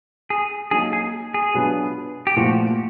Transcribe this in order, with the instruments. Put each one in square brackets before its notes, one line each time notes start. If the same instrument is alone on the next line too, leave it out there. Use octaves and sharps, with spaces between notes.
[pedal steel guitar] G#4
[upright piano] F#3 A#3 D#4 [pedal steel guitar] G#4
[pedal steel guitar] G#4
G#4
[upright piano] B2 F#3 B3 D4 F4
[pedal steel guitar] G4
[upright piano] A#2 F3 A3 [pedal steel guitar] F#4